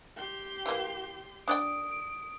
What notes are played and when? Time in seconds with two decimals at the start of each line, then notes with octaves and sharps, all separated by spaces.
0.17 G4 C6
0.66 E3 A#3
1.48 D4 D5 G5 D#6 D7